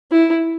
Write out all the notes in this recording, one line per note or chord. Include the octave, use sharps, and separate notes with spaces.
E4